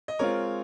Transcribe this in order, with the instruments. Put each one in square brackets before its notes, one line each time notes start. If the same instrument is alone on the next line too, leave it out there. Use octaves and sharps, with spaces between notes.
[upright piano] D#5
[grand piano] G#3 C4 F4 [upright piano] A#4 C#5